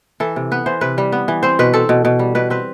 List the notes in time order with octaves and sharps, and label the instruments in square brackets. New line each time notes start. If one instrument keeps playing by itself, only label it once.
[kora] E3 A4
C3
B3 B4
E3 C5
C3 B4
G3
B3
E3
C4 C5
B2 B4
C4 A4
B2
B2
G3
B2 B4
C4 B4